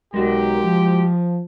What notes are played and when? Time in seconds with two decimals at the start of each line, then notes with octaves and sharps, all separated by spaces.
0.14 B1 G#3 F#4 G4 A#4
0.64 F3